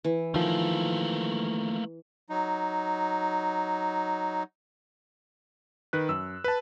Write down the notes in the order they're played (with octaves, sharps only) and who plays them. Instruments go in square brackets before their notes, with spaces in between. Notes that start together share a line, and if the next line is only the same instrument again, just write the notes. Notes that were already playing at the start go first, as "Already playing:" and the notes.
[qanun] E3
[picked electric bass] D#3 F3 [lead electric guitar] A3 A#3
[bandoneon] F#3 D#4
[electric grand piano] D#3 B4 F#6
F#2 E6
B4 A5